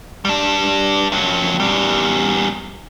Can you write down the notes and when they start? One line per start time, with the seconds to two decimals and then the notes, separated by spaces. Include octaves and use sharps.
0.25 G3 D4
1.12 F2 F#3
1.60 E2 G3